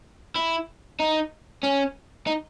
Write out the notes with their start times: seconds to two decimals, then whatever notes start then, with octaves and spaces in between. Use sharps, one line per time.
0.36 E4
1.00 D#4
1.63 C#4
2.27 D#4